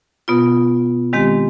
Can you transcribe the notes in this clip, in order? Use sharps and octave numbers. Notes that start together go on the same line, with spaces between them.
B2 B3 F4
D#3 G#3 C4 G4